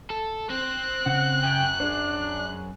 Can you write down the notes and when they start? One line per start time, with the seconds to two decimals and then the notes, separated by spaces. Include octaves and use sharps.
0.10 A4
0.50 C4 C5 F#6
1.06 C#3 F#5
1.43 F#2 G5
1.80 D4 G#4 C5